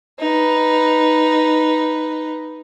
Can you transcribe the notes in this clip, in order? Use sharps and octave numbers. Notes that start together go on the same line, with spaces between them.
D#4 B4